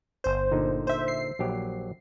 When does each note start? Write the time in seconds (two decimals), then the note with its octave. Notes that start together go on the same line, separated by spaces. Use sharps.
0.24 G1 C5
0.51 A#2 D3 D#4
0.87 C5 E5
1.08 C7
1.39 A#1 F#3 G4